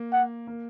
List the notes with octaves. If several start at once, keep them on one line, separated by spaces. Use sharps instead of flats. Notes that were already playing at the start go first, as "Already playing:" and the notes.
Already playing: A#3
F#5
A#3